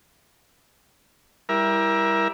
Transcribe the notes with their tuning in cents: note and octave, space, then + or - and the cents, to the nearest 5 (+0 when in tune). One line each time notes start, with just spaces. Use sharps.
G3 +15 E4 +0 A#4 +25